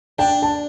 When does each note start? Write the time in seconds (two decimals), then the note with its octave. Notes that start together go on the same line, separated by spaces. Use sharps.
0.18 D4 G5
0.42 A5